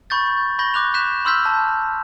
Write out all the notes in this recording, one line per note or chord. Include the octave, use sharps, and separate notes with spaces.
B5 C#6 G6 A6
B5 C#6 G6 A#6 G7
D6 F#6 F7
C#6 F#6 G6 B6 E7
B5 C6 E6 F6 G6 B6
A5